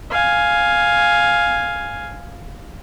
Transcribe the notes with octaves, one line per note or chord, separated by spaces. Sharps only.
F5 G#5